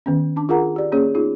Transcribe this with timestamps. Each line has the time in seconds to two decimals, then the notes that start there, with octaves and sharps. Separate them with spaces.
0.06 D#3 B3 C#4
0.36 D4 A5 D6
0.49 F4 G#4 A#4 F#5 A#5
0.76 G4 D5
0.92 A#3 C#4 G#4 C#5
1.15 B3 D#4 F4 G#4